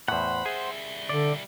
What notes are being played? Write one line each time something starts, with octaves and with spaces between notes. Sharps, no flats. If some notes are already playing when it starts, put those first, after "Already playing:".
E2 A2 C5 F#5 B5
G3 G#4 E5
D3 D5